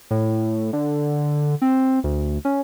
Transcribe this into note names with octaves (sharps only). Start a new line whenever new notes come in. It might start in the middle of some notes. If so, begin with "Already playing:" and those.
A2
D3
C4
D2
C#4